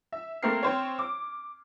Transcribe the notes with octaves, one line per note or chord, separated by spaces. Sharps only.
E5
A3 A#3 C4 A#4 F6 C7
C4 C5 C#5
D6